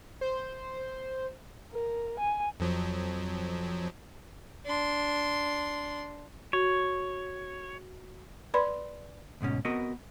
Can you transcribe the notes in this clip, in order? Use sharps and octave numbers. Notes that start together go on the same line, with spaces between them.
C5
A#4
G#5
F2 F3 F#3
D4 C6
F#4 C#5
B4 D5 B5 C6
D2 G#2 B2 C#4
B3 C4 F#4 A#4 D#5